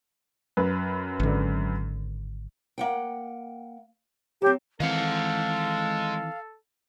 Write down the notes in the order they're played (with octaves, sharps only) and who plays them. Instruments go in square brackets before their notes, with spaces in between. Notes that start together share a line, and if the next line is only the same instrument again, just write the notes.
[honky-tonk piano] F#2 B4
[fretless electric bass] G#1 D3
[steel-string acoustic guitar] A#3 F#5 G5
[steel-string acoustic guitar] F#3 C4 [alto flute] G4
[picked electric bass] D#3 E3 C4 [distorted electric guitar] G#3 F#5 [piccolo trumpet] A4 [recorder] F5